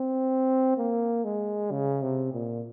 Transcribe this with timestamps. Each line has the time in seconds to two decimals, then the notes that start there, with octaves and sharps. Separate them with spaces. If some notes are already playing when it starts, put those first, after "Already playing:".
Already playing: C4
0.77 A#3
1.24 G#3
1.71 C#3
2.02 C3
2.33 A#2